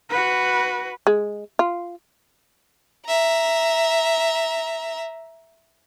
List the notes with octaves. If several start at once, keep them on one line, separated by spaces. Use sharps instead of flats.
F#4 B4
G#3
F4
E5 A#5